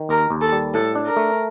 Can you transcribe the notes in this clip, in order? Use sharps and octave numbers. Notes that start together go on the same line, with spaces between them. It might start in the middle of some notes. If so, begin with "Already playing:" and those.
Already playing: D#3
D#2 A#4
D#2
A4
G3
A2 A4
D4
A#4
A3